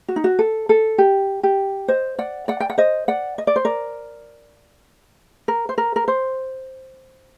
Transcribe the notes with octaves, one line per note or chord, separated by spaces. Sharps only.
F#4
D#4
F#4
A4
A4
G4
G4
C5 D#5
D5 F#5
D5 F#5
G5
F#5
C5 D#5
D5 F#5
D#5
D5
C5
A#4 D5
A#4
C5
A#4
A#4
C5